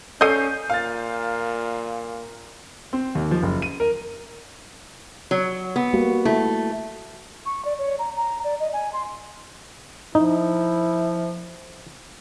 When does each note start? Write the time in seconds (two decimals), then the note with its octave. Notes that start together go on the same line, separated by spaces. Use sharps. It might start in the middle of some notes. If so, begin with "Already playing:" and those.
0.21 C#4 A4 D5 D#5 G6 C7 D#7
0.70 A#2 F5 F6 A6
2.93 C4
3.15 D#2
3.31 F3
3.43 F#1
3.62 D#7
3.80 A#4
5.31 F#3
5.76 B3
5.93 G3 A#3 F#4
6.25 A3 E4
7.46 C#6
7.65 D5
7.79 C#5
7.99 A#5
8.16 A#5
8.44 D5
8.60 D#5
8.73 G#5
8.93 C6
10.15 F3 D#4 E4